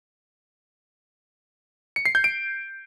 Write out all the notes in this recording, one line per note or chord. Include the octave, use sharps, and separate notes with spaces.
C#7
C7
G6
D7